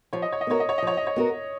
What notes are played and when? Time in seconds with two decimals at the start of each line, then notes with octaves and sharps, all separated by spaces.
0.13 F3 C#5
0.22 D#5
0.32 C#5
0.41 D#5
0.47 B3 F#4 A#4 C#5
0.60 D#5
0.69 C#5
0.78 D#5
0.82 F3 C#5
0.97 D#5
1.07 C#5
1.16 B3 F#4 A#4